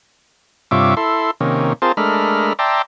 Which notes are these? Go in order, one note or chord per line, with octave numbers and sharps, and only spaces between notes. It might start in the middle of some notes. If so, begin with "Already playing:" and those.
G2 C3 F4 C#5 E5 D6
E4 A4 C6
C3 D#3 A#3 C#4
C4 F4 G#4 A#4 C5 A5
G#3 A3 D4 A#4 B5 F6
D5 E5 G5 A5 A#5 C6